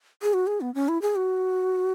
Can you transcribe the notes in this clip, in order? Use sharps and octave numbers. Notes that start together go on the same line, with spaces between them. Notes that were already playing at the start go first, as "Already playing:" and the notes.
G#4
F#4
G#4
B3
C#4
E4
G#4
F#4